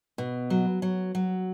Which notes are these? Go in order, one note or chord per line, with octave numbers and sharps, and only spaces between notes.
B2
F#3
F#3
F#3